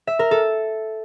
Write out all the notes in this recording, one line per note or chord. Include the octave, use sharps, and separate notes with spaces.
E5
A#4
A4